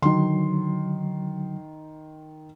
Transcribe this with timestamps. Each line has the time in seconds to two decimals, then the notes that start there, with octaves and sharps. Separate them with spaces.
0.02 D3 D#3 F#3 C6